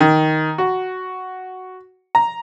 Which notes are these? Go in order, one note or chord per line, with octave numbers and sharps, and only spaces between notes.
D#3
F#4
A#5